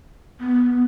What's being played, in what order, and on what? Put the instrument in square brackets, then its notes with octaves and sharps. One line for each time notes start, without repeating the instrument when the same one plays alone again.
[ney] B3